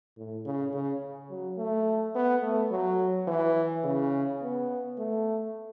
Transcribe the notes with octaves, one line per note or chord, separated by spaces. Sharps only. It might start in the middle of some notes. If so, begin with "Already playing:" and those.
A2
C#3
C#3
F#3
A3
B3
A3
F#3
E3
C#3
B3
A3